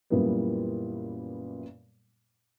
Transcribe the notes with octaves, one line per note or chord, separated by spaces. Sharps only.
F#2 A#2 E3 G3 A#3 B3